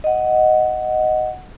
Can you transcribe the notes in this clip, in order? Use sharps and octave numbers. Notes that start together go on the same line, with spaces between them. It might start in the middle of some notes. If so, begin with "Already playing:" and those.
D#5 F#5